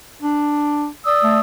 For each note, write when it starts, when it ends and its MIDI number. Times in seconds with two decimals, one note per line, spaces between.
0.22 0.88 62
1.05 1.40 74
1.05 1.40 87
1.05 1.40 88
1.23 1.41 57